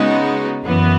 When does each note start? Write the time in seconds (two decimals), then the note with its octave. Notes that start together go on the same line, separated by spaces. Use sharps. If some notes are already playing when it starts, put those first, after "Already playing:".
Already playing: C#3 G#3 B3 D#4 F#4
0.62 F#2 E3 B3